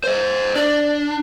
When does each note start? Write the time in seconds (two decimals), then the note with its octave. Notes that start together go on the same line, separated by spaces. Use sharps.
0.04 C5 D#5
0.56 D4 D5